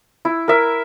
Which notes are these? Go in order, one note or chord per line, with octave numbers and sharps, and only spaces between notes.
E4
A#4 E5